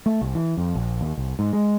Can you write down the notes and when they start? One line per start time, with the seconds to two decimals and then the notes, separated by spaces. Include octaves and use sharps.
0.06 A3
0.21 C2
0.35 E3
0.57 F2
0.75 A#1
1.01 D#2
1.18 C2
1.39 G#2
1.53 G#3